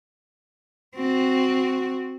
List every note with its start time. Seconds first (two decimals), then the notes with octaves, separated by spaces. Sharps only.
0.96 C4 F#4